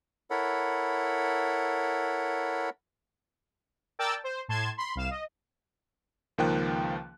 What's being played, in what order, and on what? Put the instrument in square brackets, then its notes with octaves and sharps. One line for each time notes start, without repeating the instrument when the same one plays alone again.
[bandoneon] E4 A4 A#4 C#5 F#5 B5
[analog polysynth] A#4 D5 G5 A5 E6 A6
C5
A2 A5 C6 G#6 E7
B5 C6
C2 F5 E7
D#5
[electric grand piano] C#2 D#3 F3 A#3 G5 F#6